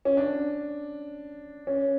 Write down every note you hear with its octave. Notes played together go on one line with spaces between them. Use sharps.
C#4
D4
C#4